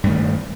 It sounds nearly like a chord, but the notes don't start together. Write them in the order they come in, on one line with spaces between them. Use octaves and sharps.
G2 A3 D#3